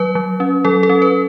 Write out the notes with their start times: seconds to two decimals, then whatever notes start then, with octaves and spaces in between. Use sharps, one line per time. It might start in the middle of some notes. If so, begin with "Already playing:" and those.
Already playing: F#3 B4
0.15 F#3
0.40 C#4
0.65 F#3 A4
0.83 A4
0.89 C#4
1.02 B4